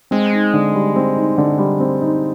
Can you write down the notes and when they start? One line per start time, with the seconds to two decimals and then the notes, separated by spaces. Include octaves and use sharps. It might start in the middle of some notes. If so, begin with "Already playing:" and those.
0.11 G#3 C4
0.33 D#4
0.54 D3
0.74 G3
0.96 C4
1.16 D#4
1.38 D3
1.58 G3
1.80 C4
2.02 D#4